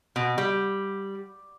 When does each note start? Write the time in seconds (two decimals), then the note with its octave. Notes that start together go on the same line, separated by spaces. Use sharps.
0.16 B2
0.38 G3